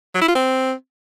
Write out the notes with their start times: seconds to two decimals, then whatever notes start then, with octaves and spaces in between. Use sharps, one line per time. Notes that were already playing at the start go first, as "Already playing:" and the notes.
0.15 F#3
0.21 E4
0.28 F4
0.35 C4